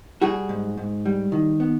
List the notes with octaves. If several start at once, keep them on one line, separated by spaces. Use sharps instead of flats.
G3 F#4 G#4
G#2
G#2
G3
D#3
B3